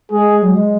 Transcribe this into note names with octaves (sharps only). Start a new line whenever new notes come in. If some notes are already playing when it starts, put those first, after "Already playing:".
G#3 G#4
F#3
G#3